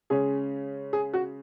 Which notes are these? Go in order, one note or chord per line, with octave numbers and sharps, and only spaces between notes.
C#3 G#3 C#4 G#4
G#4
F#4